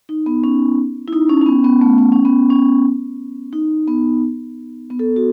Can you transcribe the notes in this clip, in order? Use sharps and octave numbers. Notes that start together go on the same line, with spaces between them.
D#4
B3
C#4
E4
D#4
C#4
C#4
B3
B3
A3
B3
C#4
B3
C#4
D#4
B3
B3
A4
F#4